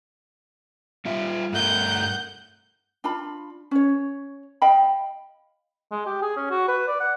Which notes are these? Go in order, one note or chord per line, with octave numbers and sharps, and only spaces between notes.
G3 F4 E5
G2 A3 A#4 F#5 G6
D4 F4 A5 B5
C#4 C#5
D#5 F5 G5 B5
G#3
G4
G#4
C#4
F#4
B4
D5
F#5